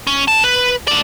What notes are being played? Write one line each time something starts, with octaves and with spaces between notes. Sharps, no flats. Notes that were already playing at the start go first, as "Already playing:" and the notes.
C#4
D3 A5
B4
A3 D5